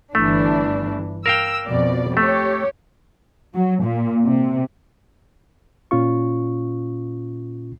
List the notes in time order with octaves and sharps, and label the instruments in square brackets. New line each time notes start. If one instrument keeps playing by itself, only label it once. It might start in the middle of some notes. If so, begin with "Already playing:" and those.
[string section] G1 E3 D4 [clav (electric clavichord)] A3
[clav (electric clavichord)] A#4 F5 G5 [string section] E6
[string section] F2 B2 D5
[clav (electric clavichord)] A3 [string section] G4 C#5
[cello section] F#3
A#2
C3
[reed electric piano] A#2 C#4 F4 C#6